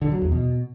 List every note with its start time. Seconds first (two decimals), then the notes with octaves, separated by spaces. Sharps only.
0.01 D3
0.12 F#3
0.22 E2
0.32 B2